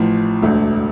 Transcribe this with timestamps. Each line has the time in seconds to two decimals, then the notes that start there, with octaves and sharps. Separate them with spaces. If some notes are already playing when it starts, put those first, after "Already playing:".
Already playing: A1 A2 F3
0.42 E1 D2 D3 A3